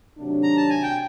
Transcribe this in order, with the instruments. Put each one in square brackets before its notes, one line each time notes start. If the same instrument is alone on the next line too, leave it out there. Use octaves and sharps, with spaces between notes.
[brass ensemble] C3 D#3 F#3 A3 D4
[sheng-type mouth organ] A#5
A5
G#5
G5